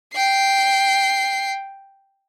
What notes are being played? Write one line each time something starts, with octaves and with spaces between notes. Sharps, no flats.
G5 C7